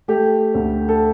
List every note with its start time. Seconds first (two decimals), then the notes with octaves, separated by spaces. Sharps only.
0.08 A3 G4
0.54 D2
0.89 A4